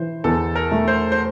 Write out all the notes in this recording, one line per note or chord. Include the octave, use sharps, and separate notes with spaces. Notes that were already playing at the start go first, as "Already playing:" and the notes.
Already playing: E3 C5
E2 A4
A#4
A3
C5
C5